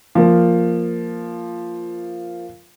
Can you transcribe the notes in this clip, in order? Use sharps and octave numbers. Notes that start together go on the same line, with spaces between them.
F3 A#3